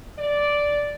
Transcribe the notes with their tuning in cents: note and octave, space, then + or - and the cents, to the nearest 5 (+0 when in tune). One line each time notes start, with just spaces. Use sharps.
D5 -5